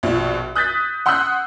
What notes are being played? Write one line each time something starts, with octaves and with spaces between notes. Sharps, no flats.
A#1 B2 F4
D#6 F#6 G6 A6 B6
F#5 C6 D#6 E6 F#6 G6